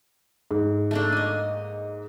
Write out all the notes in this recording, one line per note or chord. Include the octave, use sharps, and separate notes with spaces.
G#2
A3 A#3 D4
D#5 G#5